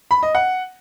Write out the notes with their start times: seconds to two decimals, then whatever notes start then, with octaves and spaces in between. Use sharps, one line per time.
0.11 B5
0.23 D#5
0.35 F#5